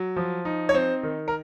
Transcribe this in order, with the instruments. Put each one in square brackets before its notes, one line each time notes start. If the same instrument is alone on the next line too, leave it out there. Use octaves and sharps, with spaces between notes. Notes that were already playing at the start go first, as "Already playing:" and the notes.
Already playing: [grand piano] F#3
F3
D#4
C#5
C4 C5
D#3
A#4